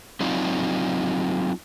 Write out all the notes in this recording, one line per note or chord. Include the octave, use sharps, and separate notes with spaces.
F#3 C4 D4 D#4 F4